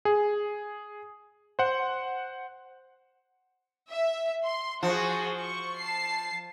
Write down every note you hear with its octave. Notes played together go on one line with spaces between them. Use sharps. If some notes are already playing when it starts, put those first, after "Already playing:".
G#4
C5 F#5
E5
C6
F3 F#4 G#4
C#6
A5 C7